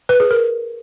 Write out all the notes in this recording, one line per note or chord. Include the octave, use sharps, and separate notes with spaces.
B4
G#4
A#4